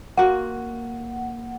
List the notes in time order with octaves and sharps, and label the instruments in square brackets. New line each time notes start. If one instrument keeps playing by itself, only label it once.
[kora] A#3 F#4 [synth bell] F#5